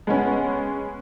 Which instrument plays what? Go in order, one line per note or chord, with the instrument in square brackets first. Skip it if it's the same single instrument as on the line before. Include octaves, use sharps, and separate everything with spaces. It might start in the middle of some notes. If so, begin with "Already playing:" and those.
[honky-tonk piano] G#3 B3 C#4